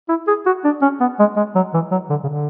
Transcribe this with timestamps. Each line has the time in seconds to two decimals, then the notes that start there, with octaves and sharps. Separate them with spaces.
0.09 E4
0.27 G#4
0.46 F#4
0.64 D4
0.82 C#4
1.00 B3
1.19 G#3
1.36 G#3
1.55 F#3
1.74 E3
1.91 F#3
2.09 D3
2.23 C#3
2.29 D3